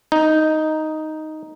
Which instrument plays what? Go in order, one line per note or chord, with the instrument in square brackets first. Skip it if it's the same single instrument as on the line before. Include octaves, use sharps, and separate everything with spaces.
[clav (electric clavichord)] D#4